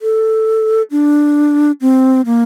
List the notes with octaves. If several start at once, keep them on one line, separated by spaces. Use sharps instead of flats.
A4
D4
C4
A#3